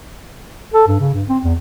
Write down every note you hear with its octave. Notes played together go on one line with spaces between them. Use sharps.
A4
G2
C#3
G2
C4
E2